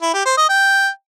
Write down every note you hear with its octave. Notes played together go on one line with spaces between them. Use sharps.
E4
G4
C5
D#5
G5